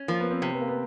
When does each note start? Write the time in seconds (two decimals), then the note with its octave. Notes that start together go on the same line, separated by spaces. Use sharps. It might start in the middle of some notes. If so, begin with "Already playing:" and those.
Already playing: C#4
0.08 F3 A#3
0.20 B3
0.31 C4
0.42 C3
0.53 B3
0.60 A#3
0.68 B3